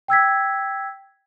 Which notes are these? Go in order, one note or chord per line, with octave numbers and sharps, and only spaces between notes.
G5 E6 G#6 B6